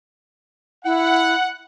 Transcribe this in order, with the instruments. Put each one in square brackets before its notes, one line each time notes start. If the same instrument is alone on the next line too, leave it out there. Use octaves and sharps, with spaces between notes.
[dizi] E4 [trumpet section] F#5